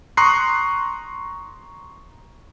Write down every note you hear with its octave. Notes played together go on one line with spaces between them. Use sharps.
A#5 C6 C#6 D#6 F#6 C7